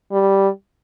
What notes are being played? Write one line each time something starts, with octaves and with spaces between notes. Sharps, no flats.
G3